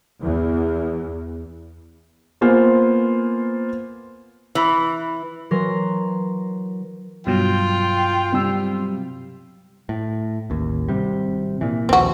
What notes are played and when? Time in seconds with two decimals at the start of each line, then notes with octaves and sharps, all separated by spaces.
0.22 E2
2.41 A#3 B3 F4 C5 F5 G#5
4.55 E3
5.51 E3 F#3 A#4 C6
7.27 G2 B2 F#3 F4 G5
8.32 C3 G3 E6
9.89 A2
10.50 A1 D#2
10.89 G#1 C3 G3
11.61 A#2 E3
11.89 A#1 D#2 C4 F#4